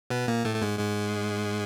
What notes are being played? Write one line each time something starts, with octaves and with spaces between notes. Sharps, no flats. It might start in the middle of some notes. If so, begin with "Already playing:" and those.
B2 B3
A#2 A#3
A2 A3
A3
G#2 G#3
G#2 G#3